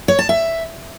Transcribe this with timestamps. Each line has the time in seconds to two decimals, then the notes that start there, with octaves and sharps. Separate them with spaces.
0.08 C#5
0.19 A5
0.29 E5